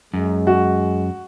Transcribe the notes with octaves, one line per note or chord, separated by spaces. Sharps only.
F#2 G#3
F#4